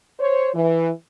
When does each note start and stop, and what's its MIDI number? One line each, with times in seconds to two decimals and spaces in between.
0.20 0.49 72
0.20 0.49 73
0.54 0.90 52